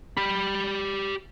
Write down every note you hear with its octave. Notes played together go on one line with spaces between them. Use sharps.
G4 B5